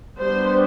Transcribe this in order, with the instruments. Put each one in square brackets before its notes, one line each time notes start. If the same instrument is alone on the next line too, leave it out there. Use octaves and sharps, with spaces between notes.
[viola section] G3 B3 D4 C5